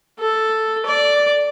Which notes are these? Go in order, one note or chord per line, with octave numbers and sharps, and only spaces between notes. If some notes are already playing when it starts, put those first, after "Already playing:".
A4
D5